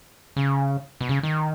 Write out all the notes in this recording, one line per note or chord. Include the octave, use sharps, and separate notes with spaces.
C#3
B2
C#3
D#3